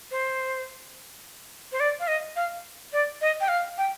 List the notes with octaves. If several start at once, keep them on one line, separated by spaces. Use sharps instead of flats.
C5
C5
D5
F5
D#5
F5
D5
D#5
G5
F5
G5